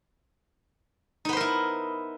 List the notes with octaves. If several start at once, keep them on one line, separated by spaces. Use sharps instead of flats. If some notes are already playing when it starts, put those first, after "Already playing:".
B3 D#4 E4 A#4 C5